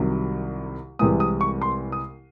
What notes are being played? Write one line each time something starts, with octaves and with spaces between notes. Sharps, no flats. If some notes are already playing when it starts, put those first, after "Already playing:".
Already playing: C2 C3 D#3 F#3
C2 C3 E3 G#3 D#6
D#6
C#6
C6
D#6